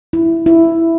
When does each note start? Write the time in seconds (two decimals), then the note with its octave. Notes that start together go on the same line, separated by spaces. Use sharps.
0.13 E4
0.46 E4